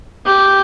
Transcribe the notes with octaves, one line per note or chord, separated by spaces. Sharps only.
G4